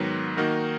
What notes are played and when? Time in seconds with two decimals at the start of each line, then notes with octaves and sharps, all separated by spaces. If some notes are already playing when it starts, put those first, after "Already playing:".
Already playing: G#2 D#3 F#3 B3
0.37 D#3 A#3 D#4 F#4 A#4